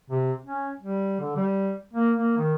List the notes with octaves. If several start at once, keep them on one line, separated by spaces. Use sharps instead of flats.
C3
C#4
G3
D3
G3
A#3
A#3
D#3